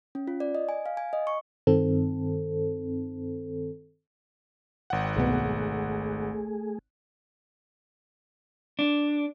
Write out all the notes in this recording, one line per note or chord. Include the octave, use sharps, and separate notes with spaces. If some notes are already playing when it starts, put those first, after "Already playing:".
C#4
F4
D5
D#5
G#5
F5
G#5
D#5
C#6
G2 D#3 C4 A4
G#1 F#5 G5
C2 B2 A3 B3 G#4
D4